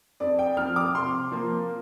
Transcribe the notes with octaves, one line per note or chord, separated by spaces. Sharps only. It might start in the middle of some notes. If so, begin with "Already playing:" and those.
F2 D5
G5
F3 C4 F6
D6
C3 C6
F3 A#3